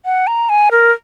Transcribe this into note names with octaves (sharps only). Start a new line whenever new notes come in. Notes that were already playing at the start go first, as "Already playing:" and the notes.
F#5
A#5
G#5
A#4